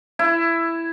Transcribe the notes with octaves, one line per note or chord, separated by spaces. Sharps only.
E4